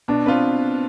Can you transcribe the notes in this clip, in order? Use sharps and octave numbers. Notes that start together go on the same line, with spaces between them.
B2 D4
B3 C4 F4 B4